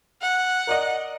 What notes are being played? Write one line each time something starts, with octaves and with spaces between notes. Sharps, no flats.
F#5
A#4 D5 D#5